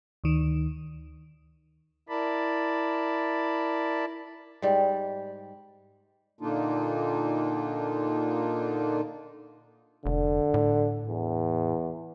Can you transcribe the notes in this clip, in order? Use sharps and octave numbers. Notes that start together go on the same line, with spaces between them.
D2 D#3
E4 A#4 D5 A5 B5
G#2 G3
A#2 D3 A#3 D4 D#4 F4
F1 D3
A2
E2